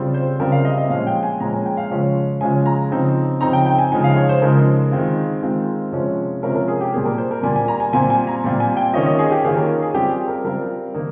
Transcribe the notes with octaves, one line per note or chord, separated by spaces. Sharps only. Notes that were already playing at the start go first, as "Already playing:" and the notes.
Already playing: C#3 G3 C4 F4
C5
C#3 G3 C4 F4 A#4
F5
D#5
D#5
A#2 F3 G#3 C#4 F5
G5
G#5
A#2 F3 G#3 C#4 A#5
G#5
G5
F5
C#3 F3 G#3 C#4 F4
C#3 F3 G#3 C#4 F4 G#5
A#5
C#3 F3 C4 D#4
C#3 F3 C4 D#4 A#5
G5
G5
G#5
C#3 F3 G#3 D#4 G#5
F5
C#5
C5
C#3 F3 G#3 D#4 A#4
D#3 G#3 C4 F4
D#3 G#3 C4 F4
C3 F3 G#3 C#4 F4
C3 F3 G#3 C#4 F4 A#4
A#4
G#4
G4
A#2 G3 A#3 G#4
A#4
C5
A#4
A#2 G3 A#3 G#5
G#5
A#5
G#5
A#2 G3 C4 F4 G#5
G#5
A#5
A#2 G3 C4 F4
G#5
G5
D#3 A#3 C#4 F4 D#5
D#5
G#4
G4
D#3 A#3 C#4 F4 G#4
A#4
G#4
G3 C4 F4 G4
G#4
A#4
G3 C4 F4 A#4
D#3 A#3 D#4